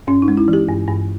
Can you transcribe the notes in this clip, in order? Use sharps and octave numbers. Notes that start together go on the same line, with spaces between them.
G2 C#4
D#4
G#3
E4
E3
G4
G2
G2